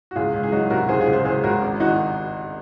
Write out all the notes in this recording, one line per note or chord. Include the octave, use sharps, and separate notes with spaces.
F#4
C#2 F4 G#4
C#2
G#4
F#3 D#4 F#4
C3 F#4 A#4
C#2 G#4 C5
F4 G#4
C#2
G#4 C5
C#2 G#4 C5
C#2 F#4 A#4
G#1
D#3 D#4 F#4